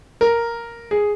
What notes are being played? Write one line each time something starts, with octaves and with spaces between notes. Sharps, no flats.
A#4
G#4